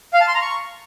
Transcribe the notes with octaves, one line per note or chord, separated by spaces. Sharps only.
F5
A5
C6
A#5
C#6